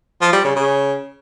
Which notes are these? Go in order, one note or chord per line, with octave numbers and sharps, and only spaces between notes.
F3
G3
C#3
C#3